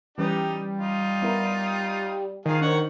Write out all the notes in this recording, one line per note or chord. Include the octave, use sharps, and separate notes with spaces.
E3 G3 C#4 D#4 G4 B4
D#4 F4
B3 E4 A#4
D#3 F3 G#4 F5
D4 C5 C#5 F#5